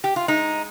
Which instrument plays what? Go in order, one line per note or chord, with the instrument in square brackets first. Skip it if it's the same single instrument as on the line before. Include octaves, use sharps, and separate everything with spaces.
[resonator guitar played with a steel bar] G4
F4
G#3 D#4